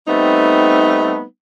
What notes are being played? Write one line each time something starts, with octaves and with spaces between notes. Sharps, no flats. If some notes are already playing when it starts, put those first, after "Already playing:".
G3 A3 B3 C4 D#4